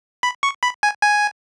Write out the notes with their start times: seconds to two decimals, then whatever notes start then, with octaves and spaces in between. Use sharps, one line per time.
0.23 B5
0.43 C#6
0.63 B5
0.83 G#5
1.03 G#5